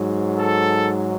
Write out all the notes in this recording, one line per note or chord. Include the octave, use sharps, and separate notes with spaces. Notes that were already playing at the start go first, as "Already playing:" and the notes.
Already playing: G#2 F#3
A4